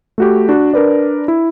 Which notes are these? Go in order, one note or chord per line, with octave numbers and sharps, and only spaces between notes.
A3 F#4 G4
D4 F#4
D4 A#4 B4 D5
E4